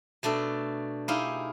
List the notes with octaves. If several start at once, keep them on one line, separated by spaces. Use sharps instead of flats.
B2 A3 D4 A4
D#4 E4 G4 G#4 F5